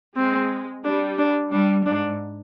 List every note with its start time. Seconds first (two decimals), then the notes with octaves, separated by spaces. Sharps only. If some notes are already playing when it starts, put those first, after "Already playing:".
0.16 G#3 C4
0.84 G3 D4
1.18 D4
1.52 G3 D4
1.86 G#2 D4